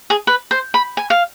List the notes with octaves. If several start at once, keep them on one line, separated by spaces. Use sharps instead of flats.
G#4
B4
C5
B5
G#5
F5